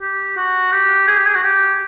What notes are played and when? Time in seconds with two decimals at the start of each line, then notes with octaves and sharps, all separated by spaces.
0.01 G4
0.37 F#4
0.72 G4
1.07 G#4
1.17 G4
1.27 G#4
1.35 F#4
1.43 G4